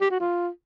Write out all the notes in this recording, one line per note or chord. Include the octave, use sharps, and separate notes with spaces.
G4
F#4
F4